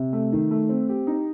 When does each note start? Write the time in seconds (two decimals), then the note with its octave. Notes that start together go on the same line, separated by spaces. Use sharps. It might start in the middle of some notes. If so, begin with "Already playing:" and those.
Already playing: C3
0.13 A3
0.32 D#3
0.51 A3
0.69 C4
0.89 G4
1.07 D#4